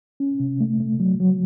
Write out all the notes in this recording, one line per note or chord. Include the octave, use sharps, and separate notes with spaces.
C#4
C3
A3
A3
F#3
F#3